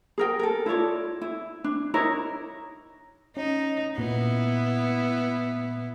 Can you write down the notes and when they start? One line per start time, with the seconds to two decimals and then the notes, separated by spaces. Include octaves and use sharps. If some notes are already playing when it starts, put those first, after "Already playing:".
0.18 G#4 A#4 G5
0.39 A4 A#4
0.66 E4 F4 C#5 D5
1.21 E4
1.64 D4
1.94 D#4 E4 A#4 C#5
3.37 C#4 D#4
3.98 A#2 B3 E4